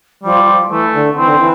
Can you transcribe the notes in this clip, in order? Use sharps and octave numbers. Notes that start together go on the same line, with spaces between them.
F3 G3
F3
E3 A3
D3
E3 C4
D3
E3